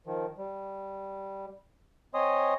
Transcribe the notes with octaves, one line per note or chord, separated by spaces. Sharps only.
D#3 F3
G3
C4 C#5 D#5 G#5 C6 D#6